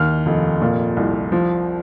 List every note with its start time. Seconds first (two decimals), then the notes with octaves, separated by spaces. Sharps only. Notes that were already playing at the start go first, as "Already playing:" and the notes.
Already playing: D#2 F6
0.26 F1
0.62 A#2
0.97 C2
1.32 F3